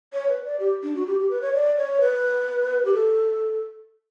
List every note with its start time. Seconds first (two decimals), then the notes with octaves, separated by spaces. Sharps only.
0.13 C#5
0.29 B4
0.45 D5
0.60 G4
0.83 D4
0.95 F#4
1.07 G4
1.19 G4
1.30 B4
1.42 C#5
1.54 D5
1.77 C#5
2.00 B4
2.85 G4
2.94 A4